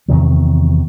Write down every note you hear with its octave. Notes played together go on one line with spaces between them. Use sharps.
E2 C3 D#3 F#3